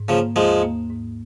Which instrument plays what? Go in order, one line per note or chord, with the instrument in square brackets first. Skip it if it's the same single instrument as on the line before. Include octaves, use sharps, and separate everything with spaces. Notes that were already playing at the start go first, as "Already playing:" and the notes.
Already playing: [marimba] G#2
[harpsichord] C#3 F3 [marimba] A#3
[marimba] D#2 [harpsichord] F3 G#3
[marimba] A#3
G#2